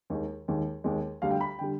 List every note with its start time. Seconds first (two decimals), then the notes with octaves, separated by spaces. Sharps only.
0.10 D#2 D#3 G#3
0.48 D#2 D#3 G#3
0.84 D#2 D#3 G#3
1.22 D2 D3 G3 F5
1.31 G5
1.41 B5
1.59 D3 G3 G5